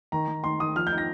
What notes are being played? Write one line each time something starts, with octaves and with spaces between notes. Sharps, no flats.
D#3 A#5
D#3
D#3 C6
D#3 D#6
F3 F6
G6
D#4
A#6